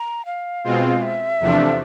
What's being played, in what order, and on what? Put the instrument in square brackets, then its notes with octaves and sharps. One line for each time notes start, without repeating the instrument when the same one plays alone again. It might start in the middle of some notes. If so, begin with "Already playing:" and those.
Already playing: [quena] A#5
F5
[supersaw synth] B2 G#3 C4 F4
[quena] E5
[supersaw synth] E2 C3 F3 A3 D4